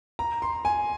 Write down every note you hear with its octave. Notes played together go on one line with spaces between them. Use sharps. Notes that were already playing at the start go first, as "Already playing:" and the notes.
A#5
C6
G#5